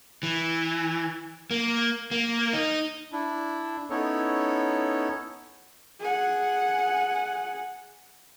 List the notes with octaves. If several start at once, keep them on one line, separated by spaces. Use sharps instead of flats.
E3
A#3
A#3
D#4
D4 E4
B3 C#4 D#4 E4 A4 C#5
G#4 F#5